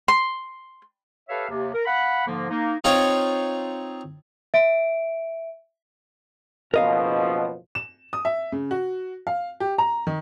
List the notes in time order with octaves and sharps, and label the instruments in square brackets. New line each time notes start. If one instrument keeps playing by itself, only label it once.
[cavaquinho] C6
[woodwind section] G4 A4 B4 C#5 E5 F5
D#2 C3
A#4
F5 F#5 B5
G#2 D3 F3 A#3
A#3 D#4
[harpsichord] C4 D#4 F4 C#5
[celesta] E5 D7
[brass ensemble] F#1 B2 F3 [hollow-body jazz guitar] A#4 D#5 F5
[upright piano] E7
D#6
E5
C#3
F#4
F5
G4
A#5
D#3